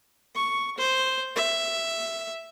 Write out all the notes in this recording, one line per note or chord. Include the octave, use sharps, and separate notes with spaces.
C#6
C5
E5